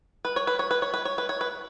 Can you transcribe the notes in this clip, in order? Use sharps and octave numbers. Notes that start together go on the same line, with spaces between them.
B4
C#5
B4
C#5
B4
C#5
B4
C#5
B4
C#5
B4